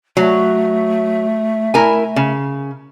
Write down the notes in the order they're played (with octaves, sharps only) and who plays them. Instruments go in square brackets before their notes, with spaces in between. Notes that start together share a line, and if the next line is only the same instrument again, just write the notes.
[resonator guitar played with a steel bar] F#3 [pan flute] A3
[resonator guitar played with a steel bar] E4 A#4 G#5
C#3